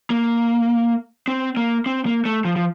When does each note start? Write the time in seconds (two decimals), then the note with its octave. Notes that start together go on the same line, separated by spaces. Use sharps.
0.10 A#3
1.28 C4
1.57 A#3
1.86 C4
2.06 A#3
2.25 A3
2.45 F3
2.56 F3